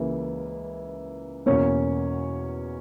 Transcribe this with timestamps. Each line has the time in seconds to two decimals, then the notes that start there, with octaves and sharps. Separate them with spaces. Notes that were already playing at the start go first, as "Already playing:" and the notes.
Already playing: C#2 C#3 E3 A#3
1.46 E2 B2 A#3 C#4 C#5